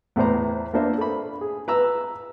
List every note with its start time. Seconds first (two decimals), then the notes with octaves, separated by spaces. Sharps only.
0.16 E2 A2 B4 C5 A#5
0.74 A#3 B3 D4 C5 E5
0.98 A4 B5
1.41 G#4
1.68 B4 A#5 E6